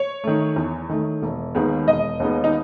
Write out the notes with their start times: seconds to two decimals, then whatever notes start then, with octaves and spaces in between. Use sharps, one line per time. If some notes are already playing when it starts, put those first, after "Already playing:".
Already playing: C#5
0.24 D#3 A3
0.56 E2
0.89 D#3 A3
1.22 E1
1.55 D#2 D#3 G#3 B3
1.87 E1 D#5
2.20 D#2 D#3 G#3 B3
2.44 D#4